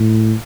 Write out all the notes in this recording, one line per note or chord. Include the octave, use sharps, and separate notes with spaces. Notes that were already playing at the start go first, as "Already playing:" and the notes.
Already playing: A2